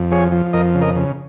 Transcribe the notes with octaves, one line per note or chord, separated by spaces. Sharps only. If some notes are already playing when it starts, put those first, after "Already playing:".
Already playing: F2
F3 G#4 C#5
F3
F2 A#4 D#5
C#3
A#4 D#5
C#3